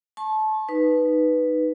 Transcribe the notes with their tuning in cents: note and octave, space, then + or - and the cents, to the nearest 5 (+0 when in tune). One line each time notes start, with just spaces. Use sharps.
A5 -25 C#6 -40
D#4 -10 B4 +0